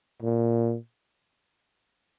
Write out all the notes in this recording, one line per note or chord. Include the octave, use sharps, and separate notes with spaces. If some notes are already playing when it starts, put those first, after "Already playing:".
A#2